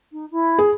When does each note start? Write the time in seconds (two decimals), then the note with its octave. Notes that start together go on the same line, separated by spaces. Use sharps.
0.12 D#4
0.31 E4
0.58 G#4